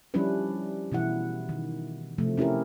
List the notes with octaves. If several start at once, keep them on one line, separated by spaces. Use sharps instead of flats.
F3 G3 C#4 D4 E4 B4
B2 E3 E4 F#5
D#3
C3 F3 A3
C#4 E4 G4 A#4